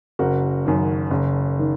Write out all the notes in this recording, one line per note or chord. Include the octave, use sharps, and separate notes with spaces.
F#1 F#4 A#4
F#2 D#3 F#3
F#1
D#3